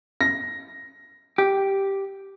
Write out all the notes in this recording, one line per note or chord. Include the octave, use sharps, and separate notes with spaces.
A#6
G4